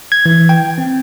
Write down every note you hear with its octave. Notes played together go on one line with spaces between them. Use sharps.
G#6
E3
G5
C4